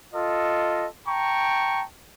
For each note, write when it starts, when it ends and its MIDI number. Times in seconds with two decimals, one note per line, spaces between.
0.14 0.87 65
0.14 0.87 69
0.14 0.87 75
1.07 1.84 79
1.07 1.84 81
1.07 1.84 82
1.07 1.84 85